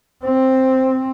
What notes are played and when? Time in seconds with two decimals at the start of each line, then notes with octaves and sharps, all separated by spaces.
0.24 C4 C5